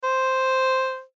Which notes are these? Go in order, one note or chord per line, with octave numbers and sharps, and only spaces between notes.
C5